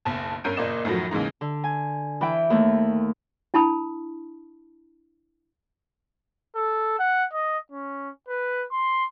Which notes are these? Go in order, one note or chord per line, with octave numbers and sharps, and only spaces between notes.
F#1 B1 A5
G2 C#4 A#4 G6 D7 D#7
F#1 A#2 A#3 D5 D#5 E7
F#2 A2 D#3 F3 F#3
D#2 C#3 E3 G#3 D#4
D3
G#5
E3 E4 G5
D#2 A3
D4 E4 A5 B5 D#6
A4
F#5
D#5
C#4
B4
C6